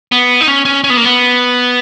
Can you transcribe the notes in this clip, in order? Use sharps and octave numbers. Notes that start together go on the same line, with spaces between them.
B3
D#4
C#4
C#4
C#4
B3
A#3
B3